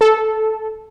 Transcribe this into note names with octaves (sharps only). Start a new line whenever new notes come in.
A4